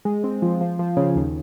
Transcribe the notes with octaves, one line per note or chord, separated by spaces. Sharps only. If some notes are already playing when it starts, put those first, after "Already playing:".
G#3
C4
F3
F3
F3
C#3
D#2